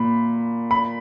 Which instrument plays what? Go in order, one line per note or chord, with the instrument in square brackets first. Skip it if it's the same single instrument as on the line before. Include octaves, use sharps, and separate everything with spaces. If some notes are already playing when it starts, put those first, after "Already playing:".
Already playing: [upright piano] A#2 [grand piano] B5
[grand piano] B5